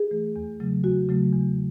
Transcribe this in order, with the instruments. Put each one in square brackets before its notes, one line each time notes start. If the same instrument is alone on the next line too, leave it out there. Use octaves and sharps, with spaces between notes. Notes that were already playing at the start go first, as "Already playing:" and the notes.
Already playing: [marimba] G#4
E3 A3
E2
C#3 F#3 A3
E2 F#4
C#3 F#3 A3
E2